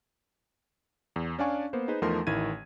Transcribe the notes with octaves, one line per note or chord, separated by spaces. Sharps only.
E2
C#4 D4 D5 F5 G#5 C#6
A#3 B3 C5
D#4 G#4 B4 C5
E2 F3 A3 D#4 A#4 C6
A1 D#3 E4 G#6 D#7